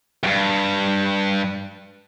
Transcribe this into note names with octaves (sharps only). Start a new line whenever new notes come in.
E2 G2